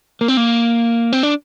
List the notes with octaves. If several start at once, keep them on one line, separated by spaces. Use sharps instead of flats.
A#3
C4
A#3
C4
D4